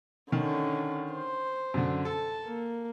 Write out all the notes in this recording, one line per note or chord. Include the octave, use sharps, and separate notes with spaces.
D3 D#3 C#4
C5
F#2 D3
A4 A5
A#3